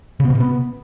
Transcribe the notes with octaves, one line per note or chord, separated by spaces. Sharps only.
C#3
B3
B2
C3
B3